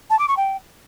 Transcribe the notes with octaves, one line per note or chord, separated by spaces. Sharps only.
A5
D6
C#6
G5